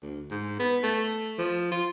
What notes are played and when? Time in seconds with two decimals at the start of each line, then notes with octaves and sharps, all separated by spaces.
0.02 D2
0.30 G#2
0.59 B3
0.83 A3
1.38 F3
1.72 F4